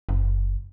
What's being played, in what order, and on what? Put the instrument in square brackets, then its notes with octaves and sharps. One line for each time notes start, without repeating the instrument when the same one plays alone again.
[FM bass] F#1